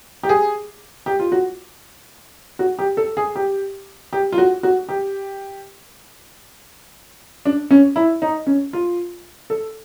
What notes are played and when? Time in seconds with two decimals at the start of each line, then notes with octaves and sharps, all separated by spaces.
0.23 G4
0.29 G#4
1.06 G4
1.19 F4
1.32 F#4
2.59 F#4
2.79 G4
2.97 A4
3.17 G#4
3.35 G4
4.13 G4
4.33 F4
4.38 F#4
4.63 F#4
4.89 G4
7.46 D4
7.71 C#4
7.96 E4
8.22 D#4
8.47 C#4
8.73 F4
9.50 A4